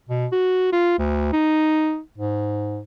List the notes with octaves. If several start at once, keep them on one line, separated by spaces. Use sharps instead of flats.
B2
F#4
F4
D2
D#4
G#2